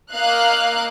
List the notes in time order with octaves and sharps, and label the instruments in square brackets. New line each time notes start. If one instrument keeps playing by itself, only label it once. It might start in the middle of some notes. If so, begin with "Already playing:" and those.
[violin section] A#3 D#5 F5 F#6